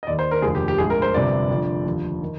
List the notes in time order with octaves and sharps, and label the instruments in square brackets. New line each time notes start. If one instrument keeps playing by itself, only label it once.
[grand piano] D#5
D#2 D#3 D5
C5
A#4
F1 D#2 D3 F3 G#4
G4
G4
A#1 G#2 F3 G#4
A#4
C5
G1 F2 C3 D5
F1 F2 D3 F3
D#2 D3 F3
D#3